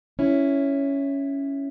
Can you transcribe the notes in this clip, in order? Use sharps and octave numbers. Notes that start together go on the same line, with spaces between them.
C#4 E4